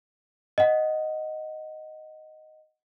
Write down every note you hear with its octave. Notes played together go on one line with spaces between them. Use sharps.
D#5 F#5